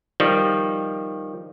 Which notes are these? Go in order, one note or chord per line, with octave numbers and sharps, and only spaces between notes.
D#3 F3 G3